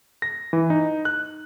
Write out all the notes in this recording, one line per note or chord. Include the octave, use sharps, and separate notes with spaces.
A#6
E3
D#4
F#6